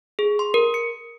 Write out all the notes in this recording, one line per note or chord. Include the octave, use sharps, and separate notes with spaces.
G#4
C6
A#4
C#7